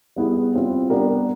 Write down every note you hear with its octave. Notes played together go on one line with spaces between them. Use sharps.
G3 B3 E4 G#4
G3 C4 F4
G3 B3 D4 G4 A#4